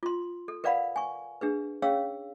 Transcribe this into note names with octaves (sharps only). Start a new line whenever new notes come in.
F4 C6
A4
A#4 B4 D5 F5 F#5 B5
G#5 C#6
D4 G#4 B4
C#4 G#4 C#5 F5 E6